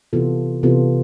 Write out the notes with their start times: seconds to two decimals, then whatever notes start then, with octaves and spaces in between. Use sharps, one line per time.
0.13 C3 E3 B3 F4 A4
0.63 C3 E3 B3 F4 A4